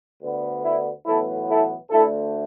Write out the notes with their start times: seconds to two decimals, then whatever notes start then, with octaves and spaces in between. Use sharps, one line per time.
0.21 D2 D3 B3
0.64 E4
1.05 B1 A2 E3 B3 E4 A4
1.48 E4 A4
1.91 D2 D3 A3 E4 A4